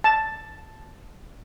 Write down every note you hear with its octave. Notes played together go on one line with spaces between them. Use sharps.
A5